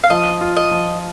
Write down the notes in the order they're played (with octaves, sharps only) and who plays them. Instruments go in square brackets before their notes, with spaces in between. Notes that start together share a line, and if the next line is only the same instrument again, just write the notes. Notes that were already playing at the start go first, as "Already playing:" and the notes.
[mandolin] F5
[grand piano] F3 [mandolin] D#5
[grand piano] F4
[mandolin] D#5
[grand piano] F3